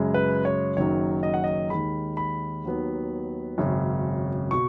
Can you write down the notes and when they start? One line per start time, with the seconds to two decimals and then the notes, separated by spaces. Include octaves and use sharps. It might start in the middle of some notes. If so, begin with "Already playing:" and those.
Already playing: F#2 C#3 G#3
0.14 B4
0.45 C#5
0.77 F#1 F#2 D#3 F#3 C#5
1.23 D#5
1.34 F#5
1.44 D#5
1.70 D#2 D#3 G#3 B5
2.17 B5
2.64 D#2 D#3 F#3 B3
3.58 G#1 F#2 C#3
4.51 B2 C#6